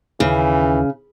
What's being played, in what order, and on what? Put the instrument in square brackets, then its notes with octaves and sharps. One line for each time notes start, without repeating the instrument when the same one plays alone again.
[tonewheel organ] D#2 [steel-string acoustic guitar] C#3 [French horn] E3